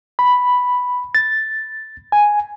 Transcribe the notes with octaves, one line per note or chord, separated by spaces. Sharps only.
B5
A6
G#5